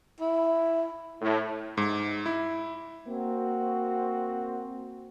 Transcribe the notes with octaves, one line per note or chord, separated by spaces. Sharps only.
E4
A2
G#2
E4
A#3 C4 F#4